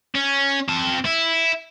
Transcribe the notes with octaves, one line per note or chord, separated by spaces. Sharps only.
C#4
C4 A5
E4